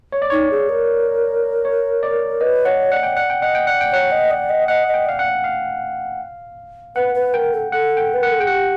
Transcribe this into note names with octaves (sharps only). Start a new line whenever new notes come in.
C#5
D5
D#4 C#5
G#4
A#4
C#5
D5
B4 D#5
C#5 F#5
D5 F#5
G5
D5 F#5
G5
D#5 F#5
G5
D5 F#5
G5
C#5 F#5
D#5
D5
D#5
D#5 F#5
D#5
G5
D5 F5
F#5
F5
B4 F#5
B4
A#4 G5
A4
A4 F#5
G5
B4
A#4 F#5
A4
G#4 G5
G4 F#5